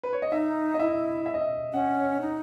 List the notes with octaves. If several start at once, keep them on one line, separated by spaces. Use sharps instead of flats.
B4
C#5
D#5
D#4 E5
D#5
E4 E5
E5
D#5
E5
C#4 F#5
D#4